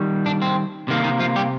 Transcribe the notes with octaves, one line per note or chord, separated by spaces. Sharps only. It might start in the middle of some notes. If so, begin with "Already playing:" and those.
Already playing: D#3 G3
D4
C4
C3 D#3 A#3
D#3 D#4
F3 F4
G3 G4